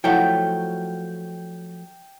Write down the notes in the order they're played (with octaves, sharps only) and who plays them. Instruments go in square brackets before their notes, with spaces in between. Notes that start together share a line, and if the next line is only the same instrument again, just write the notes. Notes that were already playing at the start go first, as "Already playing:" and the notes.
[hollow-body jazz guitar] F3 F#3 A3 [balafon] E4 F#5 [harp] G5